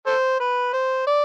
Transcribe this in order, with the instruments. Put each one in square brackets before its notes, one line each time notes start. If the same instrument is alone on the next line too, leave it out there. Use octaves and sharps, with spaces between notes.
[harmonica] A4 C5
B4
C5
D5